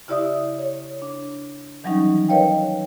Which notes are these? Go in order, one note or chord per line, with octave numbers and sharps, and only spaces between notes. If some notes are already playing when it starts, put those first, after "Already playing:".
C#3 E4 G4 D5 E5 D#6
C#5
D4
D#3 E3 F#3 G3 C#4 D#4
A#4 B4 C#5 D#5 F5 G5